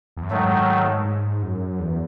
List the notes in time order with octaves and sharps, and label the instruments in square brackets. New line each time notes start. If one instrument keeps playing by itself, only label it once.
[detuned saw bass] E2
F#2
[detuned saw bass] G#2 [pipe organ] D#3 F#3 A3
[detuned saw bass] G#2
F#2
E2